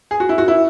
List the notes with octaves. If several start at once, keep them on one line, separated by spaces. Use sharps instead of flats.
G#4
F#4
E4
F#4
E4